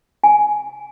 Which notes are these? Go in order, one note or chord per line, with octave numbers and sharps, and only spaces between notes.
G#5